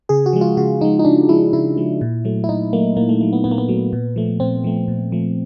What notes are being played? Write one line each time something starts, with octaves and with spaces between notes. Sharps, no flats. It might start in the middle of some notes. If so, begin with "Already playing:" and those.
C#3 G#4
F#4
F3 G#3
F4
C#3 F#4
F3 G#3 D#4
D#4
C#3 D4
F3 G#3 E4
C#3 E4
F3 G#3
A#2
F#3 A3
E4
A#2 D#4
F#3 A3 A#3
A#2 A#3
A3
F#3 A3
B3
A#2 B3
A#3
B3
F#3 A3
A#2
F3 A3
A#2 C4
F3 A3
A#2
F3 A3